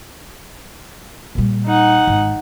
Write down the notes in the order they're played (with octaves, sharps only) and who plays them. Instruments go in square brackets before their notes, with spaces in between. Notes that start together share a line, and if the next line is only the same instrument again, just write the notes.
[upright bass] A#2 G3
[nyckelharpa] D#4 F#5
[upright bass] G#1